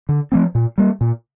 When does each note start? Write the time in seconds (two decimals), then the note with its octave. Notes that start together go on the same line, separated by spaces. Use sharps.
0.09 D3
0.32 F3 A3 C4
0.55 A#2
0.78 G3 A#3
1.01 A#2